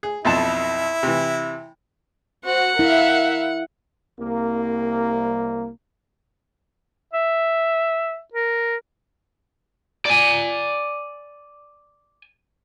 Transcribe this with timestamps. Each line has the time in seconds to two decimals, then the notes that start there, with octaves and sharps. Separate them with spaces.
0.03 G#4
0.25 B1 F2 E4 A5
1.03 C3 E3
2.46 F#4 C5 F#5
2.79 E4 A#4 E5 F5
4.19 C2 A#3
7.14 E5
8.34 A#4
10.06 D5 G#5